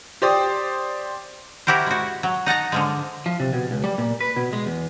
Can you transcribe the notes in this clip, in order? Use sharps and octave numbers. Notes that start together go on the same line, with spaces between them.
G4 C5 D5 D#6
E4 F#4 G4 A#4 C5
G#3 F#4
F#3
D#4 F#5 A5 A#5
D3 F3 G#3
F3
C3
B2
C#2
G3
A#2
B4
B2
G#3
E2